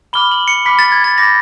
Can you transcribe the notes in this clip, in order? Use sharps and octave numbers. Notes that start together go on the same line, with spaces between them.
B5 D6 F6 G7
F#7
C#7
B5 D6 F6 B6
A6
G#6
A6
B5 D6 G6 A#6